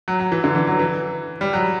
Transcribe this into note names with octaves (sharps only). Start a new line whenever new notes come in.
F#3
F#3
E3
D3
E3
F#3
E3
G3
F#3